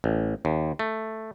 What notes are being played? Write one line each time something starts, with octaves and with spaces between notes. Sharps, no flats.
A1
D#2
A3